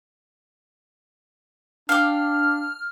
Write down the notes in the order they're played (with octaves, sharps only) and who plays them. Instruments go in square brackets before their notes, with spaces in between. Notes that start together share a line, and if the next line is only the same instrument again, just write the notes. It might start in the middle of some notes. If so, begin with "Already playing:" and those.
[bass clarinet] D4 [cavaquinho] F5 G5 D6 [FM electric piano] F6